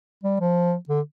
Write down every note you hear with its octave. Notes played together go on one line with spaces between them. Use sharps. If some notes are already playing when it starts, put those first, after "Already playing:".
G3
F3
D3